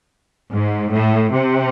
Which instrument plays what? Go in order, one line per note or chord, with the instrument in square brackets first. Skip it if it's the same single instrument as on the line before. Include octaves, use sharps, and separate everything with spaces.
[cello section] G#2
A2
C3